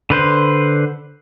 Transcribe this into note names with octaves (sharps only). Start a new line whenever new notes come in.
D3 B4 C5